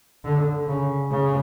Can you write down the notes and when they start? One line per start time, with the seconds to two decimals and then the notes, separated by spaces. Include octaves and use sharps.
0.24 D3
0.68 C#3
1.11 C#3